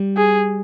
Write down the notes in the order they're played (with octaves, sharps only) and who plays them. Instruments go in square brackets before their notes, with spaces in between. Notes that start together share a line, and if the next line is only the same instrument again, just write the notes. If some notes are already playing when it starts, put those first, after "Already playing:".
Already playing: [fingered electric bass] G3
[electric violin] G#4